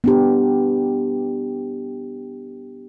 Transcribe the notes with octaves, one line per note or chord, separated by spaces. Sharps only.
B3 D4 G4